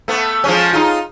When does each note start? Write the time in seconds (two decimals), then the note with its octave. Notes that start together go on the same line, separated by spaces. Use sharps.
0.08 A3 B3
0.44 F3 G#3 C#4
0.73 D#4 F4